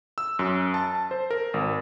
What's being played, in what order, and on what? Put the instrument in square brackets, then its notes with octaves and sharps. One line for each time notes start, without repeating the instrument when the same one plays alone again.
[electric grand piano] E6
F#2
A5
C5
A#4
G#1